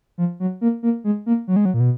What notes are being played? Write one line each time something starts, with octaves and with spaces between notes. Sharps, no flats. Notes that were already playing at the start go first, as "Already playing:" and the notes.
F3
F#3
A#3
A#3
G#3
A#3
F#3
G#3
F#3
A#2
B2